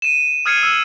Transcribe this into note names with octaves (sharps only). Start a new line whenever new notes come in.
D#7 E7
D#6 F6 G#6 C7 C#7 D#7
E6